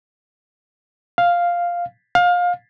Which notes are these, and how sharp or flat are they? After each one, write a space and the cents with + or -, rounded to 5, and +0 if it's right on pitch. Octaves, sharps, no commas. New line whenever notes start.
F5 +0
F5 +25